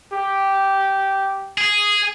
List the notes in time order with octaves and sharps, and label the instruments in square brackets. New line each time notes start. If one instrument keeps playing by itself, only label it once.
[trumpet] G4
[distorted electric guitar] G#4